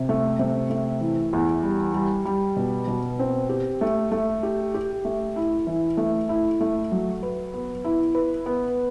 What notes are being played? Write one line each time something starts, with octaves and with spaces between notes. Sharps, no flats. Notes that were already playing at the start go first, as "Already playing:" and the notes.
Already playing: C3
A3
C3
A3
E3
E2
G3
G3
G3
B2
B2
C4
G4
A3
A3
G4
G4
A3
E4
E3
A3
E4
A3
F#3
B4
B3
E4
B4
B3